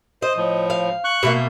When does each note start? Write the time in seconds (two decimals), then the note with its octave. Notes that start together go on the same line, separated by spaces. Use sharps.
0.22 C5 D#5
0.37 A2 F3
0.70 F5
1.04 C#6 F#6
1.23 B2 A3 A#3